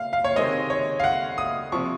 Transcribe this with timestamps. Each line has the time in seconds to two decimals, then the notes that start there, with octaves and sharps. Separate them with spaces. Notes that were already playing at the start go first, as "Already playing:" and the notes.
Already playing: F5
0.13 F5
0.24 C#5
0.36 C3 D#3 G#3 C4 D#5
0.70 C#5
1.00 F5
1.04 F#5
1.38 D#6
1.72 C3 F3 C#6